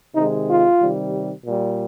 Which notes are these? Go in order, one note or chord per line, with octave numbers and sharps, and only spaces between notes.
C3 D#3 G#3 D#4
F4
C3 D#3 G3
A#2 G3